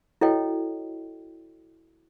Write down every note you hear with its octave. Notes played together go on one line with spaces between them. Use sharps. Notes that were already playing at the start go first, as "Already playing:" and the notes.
E4 F#4 A4 C#5 D#5 G5